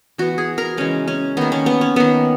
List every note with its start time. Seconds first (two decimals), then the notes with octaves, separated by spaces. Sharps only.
0.18 E3 B3 F#4
0.38 G#4
0.58 A#4
0.77 C#3 E3 G#3 C#4
1.08 C#4
1.37 D#3 A#3 B3
1.52 C#4
1.66 B3
1.81 C#4
1.96 D#3 A#3 B3